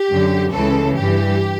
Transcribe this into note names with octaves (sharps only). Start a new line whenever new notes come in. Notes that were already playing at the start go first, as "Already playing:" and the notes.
Already playing: G4
F#2 D3
C#2 C#3 E3 A4
G2 E3 G4